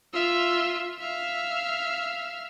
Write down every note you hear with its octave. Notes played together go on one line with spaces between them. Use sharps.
F4 E5
E5 F5